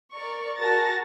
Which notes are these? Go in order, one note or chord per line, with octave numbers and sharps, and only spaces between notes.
A#4 D5 C#6
F#4 G#4 A#4 A5 A6 A#6